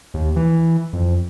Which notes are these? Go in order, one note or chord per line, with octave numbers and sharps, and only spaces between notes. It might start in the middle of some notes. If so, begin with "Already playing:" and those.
D#2
E3
F2